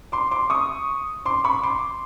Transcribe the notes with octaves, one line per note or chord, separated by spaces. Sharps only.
C6 D6
C6 D6
C#6 D#6
C6 D6
B5 C#6
C6 D6